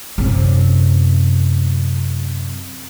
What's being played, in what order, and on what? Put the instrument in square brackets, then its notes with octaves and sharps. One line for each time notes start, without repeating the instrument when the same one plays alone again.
[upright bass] F#2 C3